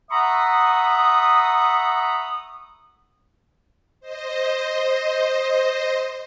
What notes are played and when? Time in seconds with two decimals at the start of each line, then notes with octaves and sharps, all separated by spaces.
0.11 E5 F#5 A#5 B5 C#6 D#6
4.00 C5 D#5